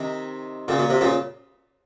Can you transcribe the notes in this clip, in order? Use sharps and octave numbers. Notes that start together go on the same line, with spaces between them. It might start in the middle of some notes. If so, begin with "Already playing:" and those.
Already playing: C3 D#3
A#2 C#3
A#2
C3
A#2 C#3